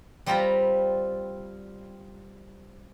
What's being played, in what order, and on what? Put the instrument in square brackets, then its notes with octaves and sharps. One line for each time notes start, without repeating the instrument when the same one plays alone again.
[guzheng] G3 C4 F4 A#5 B5